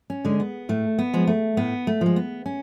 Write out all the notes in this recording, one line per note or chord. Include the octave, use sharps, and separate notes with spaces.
C#4
D3 G#3
B3
A2 A3
B3
F3 G#3
A3
A2 B3
A3
F3 G#3
B3
C#4